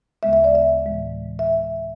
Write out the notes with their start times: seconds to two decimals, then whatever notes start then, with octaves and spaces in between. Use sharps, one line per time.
0.23 D2 C#3 G#3 B3 E5
0.33 E5
0.44 D5
0.55 E5
0.86 A2 E3 G#3
1.39 E5